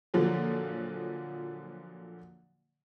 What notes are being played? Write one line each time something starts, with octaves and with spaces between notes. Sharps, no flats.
A#2 D3 F3 F#3